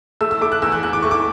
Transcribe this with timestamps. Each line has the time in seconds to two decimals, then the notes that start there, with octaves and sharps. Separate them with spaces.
0.21 A3 E6
0.31 E6
0.41 A3 D6
0.52 F#6
0.62 E2 E6
0.72 F#6
0.83 E2 F#6
0.93 D6
1.02 A3 C#6
1.11 D6